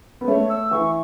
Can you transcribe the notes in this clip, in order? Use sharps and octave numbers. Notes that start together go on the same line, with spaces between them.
B3
A3 C#5
E6
E3 C#6